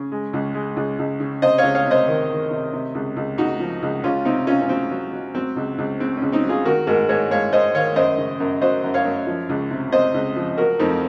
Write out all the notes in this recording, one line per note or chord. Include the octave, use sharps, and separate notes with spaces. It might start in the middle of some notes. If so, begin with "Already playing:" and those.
Already playing: C#3
G#3
C#2
G#3
C#2
C#2
C#3
C3 C5 D#5
C#5 F5
C#2
C#5 F5
C3
C5 D#5
D#3
D#3
C3
C3
C#2
C#2
C#2 D#4 F#4
F3
C#2
C#2 C#4 F4
C3 C4 D#4
C3 C#4 F4
C#4
F#3 C4
F#3
F#3
F#3 C4
C#2
C#2
C#3 C4
C#2 C#4
C4 D#4
F#3
F4 G#4
D#3 F#4 A#4
G#2 F#4 A#4
G#2 A#4 C#5
G#2 C#5 F5
G#2 C5 D#5
D#3 C#5 F5
F#2 C5 D#5
C#3
F#2
F#3 C5 D#5
F#2
C#5 F5
F#2
F3
C#2
C3
C3 C5 D#5
C#2
F3
F#3 F#4 A#4
F2 C4 D#4